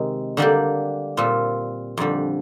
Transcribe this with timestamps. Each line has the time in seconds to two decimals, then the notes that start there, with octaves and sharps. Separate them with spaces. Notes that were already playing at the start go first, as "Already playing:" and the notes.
Already playing: C3 D#3 G#3 D#4
0.37 D3 G3 A#3 D4 G4
1.17 A#2 G3 C4 F4
1.97 F2 D3 G3